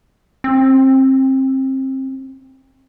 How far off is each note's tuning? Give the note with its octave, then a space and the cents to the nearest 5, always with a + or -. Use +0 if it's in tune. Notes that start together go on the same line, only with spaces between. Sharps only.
C4 +25